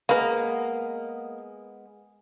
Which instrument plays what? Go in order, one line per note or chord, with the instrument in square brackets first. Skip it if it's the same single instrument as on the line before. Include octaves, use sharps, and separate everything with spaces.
[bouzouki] G#3 B3 [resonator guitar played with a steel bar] A#3 [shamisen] B4 F5